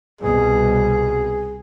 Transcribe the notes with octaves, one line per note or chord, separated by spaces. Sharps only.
C2 B2 G#4